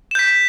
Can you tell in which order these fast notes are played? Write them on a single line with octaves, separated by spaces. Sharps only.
E7 G6 B6